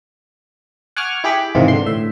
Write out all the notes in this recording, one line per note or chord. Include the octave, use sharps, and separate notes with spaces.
F#5 G#5 C#6 D6 F6
E4 G4 G#4 B5 D6
G#2 C3 D#3 E3 F4
D3 C6
A2 E5